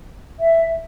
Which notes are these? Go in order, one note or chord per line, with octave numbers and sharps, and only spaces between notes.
E5